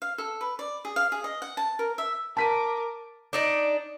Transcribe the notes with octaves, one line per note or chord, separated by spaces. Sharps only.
F5
A4
B4
D5
G#4
F5
G#4
D#5
F#5
A5
A#4
E5
A#4 A5 D6 B6 D#7
D4 D#4 D5